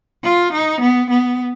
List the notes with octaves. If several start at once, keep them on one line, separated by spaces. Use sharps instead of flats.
F4
D#4
B3
B3